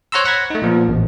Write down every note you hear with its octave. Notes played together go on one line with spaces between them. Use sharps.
C5 C#5 F#5 A#5 C6 E6
F#5 B5 G#6 A#6
A3 D#4
A#2 F3 B3
A1